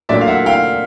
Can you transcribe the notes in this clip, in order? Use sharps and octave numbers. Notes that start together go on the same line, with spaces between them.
A#2 F#3 A3 D4 D5 E5
F5
E5 F#5
F5 G5